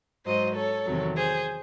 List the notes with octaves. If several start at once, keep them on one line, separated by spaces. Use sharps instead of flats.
G#2 F#3 C5 D#5
A4 C#5
E2 C3 D#3 F#3
G#4 C5